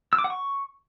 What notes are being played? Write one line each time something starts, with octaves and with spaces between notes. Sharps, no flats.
E6
D6
F#5
C#6